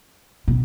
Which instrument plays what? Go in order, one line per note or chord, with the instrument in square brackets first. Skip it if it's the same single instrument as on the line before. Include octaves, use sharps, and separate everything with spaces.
[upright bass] B2